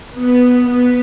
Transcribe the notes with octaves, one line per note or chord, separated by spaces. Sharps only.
B3
B3